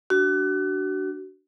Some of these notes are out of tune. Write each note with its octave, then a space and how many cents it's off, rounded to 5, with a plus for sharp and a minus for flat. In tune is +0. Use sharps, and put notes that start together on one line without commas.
D4 +0 F#4 +30